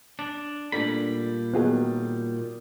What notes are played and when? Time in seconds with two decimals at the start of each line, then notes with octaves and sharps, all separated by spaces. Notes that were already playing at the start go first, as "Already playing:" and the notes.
0.19 D4
0.72 A#2 G3 A3 D4 B5
1.54 D#3 F#3 B3 F4 G#4